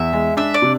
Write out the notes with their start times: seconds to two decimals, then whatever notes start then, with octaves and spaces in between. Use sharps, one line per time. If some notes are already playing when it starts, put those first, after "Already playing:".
Already playing: E2 E5
0.13 G#3
0.37 D4 E5
0.54 D5
0.62 C3